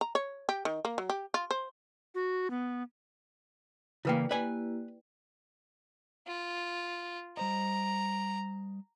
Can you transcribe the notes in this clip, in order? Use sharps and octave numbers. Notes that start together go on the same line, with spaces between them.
A#5
C#5
G4
D#3
A#3
F#3
G4
F4
C5
F#4
B3
C#3 E3 A#3 E4 B4 D5 G5
A#3 E4 G4 B4 D5 G#5
F4
G3 C5 D#5 A#5